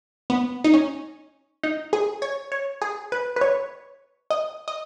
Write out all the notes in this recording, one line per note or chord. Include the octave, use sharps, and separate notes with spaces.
B3
D#4
C#4
D#4
G#4
C#5
C#5
G#4
B4
B4
C#5
D#5
D#5